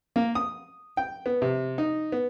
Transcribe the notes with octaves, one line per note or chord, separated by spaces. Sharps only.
A#3
D#6
G5
B3
C3
D#4
B3